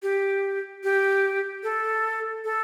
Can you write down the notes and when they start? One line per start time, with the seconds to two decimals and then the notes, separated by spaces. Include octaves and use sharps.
0.03 G4
0.84 G4
1.63 A4
2.44 A4